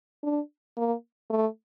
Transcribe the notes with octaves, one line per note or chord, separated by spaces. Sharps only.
D4
A#3
A3